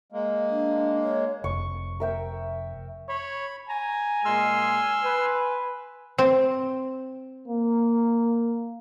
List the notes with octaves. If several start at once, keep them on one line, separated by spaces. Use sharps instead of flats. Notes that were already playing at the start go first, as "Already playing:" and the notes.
G#3 A#3
D4
C#5
F1 C#6
A#4 E5 G5
C#5 B5
G#5 A#5
A#2 G#3 C6 E6 F6
B4
C4
A#3